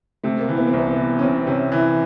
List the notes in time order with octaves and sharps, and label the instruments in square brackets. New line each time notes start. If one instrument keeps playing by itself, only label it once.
[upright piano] C3 [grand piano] A3
[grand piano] A#3
[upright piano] E3
[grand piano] B3
C4
[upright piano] C2 [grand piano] B3
[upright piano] E3
[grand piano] C#4
[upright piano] C3 [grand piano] C4
[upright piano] C3 [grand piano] C#4
[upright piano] E3